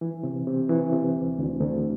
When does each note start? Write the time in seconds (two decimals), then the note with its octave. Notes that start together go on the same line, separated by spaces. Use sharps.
0.01 E3
0.23 C3
0.47 C3
0.69 E3
0.92 C3
1.16 D2
1.38 D2
1.60 D2